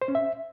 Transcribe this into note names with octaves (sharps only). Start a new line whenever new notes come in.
C5
C#4
E5